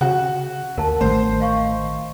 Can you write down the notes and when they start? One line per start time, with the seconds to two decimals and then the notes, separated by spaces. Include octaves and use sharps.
0.01 C#3 F#4
0.78 D#2 A#4 A5
1.01 A1 A2 D#3 A3 C5
1.40 D#5 F5 C#6